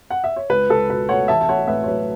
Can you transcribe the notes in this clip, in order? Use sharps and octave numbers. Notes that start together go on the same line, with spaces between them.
F#5
E5
C#5
C#2 B4
C#2 A4
B2 B4
A3 C#5 F#5
A1 E5 A5
A5
A3 C#5 F#5
A2 B4 E5
C#5
F#3 B4